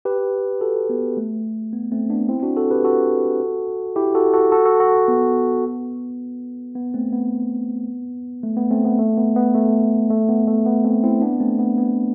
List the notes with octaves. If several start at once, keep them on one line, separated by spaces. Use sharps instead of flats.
G4 B4
F#4 A4
B3
A3
B3
A3 C4
B3 D4
C4 E4
D4 F#4
F#4 A4
G4 B4
F#4 A4
E4 G4
F#4 A4
F#4 A4
F#4 A4
F#4 A4
F#4 A4
B3
B3
A3 C4
B3
A3
B3
A3 C4
B3
A3
B3
B3
A3
A3
B3
A3
B3
A3 C4
C4 E4
B3 D4
A3 C4
B3
B3